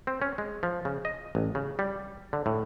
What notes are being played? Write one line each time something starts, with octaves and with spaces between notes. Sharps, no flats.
C4
C#4
G#3
F3
C#3
D#5
A1
C#3
G3
D3
A2